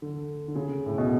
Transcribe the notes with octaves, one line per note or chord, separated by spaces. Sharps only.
D3
D3
C#3
A2
B2